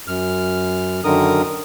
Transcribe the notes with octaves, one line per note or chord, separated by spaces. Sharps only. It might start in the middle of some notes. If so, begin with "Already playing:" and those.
F#2 F6
F#2 D3 D#3 A#4 D#6